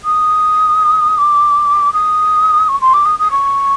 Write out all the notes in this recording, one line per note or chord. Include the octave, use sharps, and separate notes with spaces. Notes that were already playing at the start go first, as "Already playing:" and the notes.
D#6
D6
D#6
C#6
C6
D6
D#6
D#6
C#6